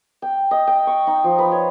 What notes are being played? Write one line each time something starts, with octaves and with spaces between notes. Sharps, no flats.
G5
D#5
G5
C#6
D#4
F3
B4
C#5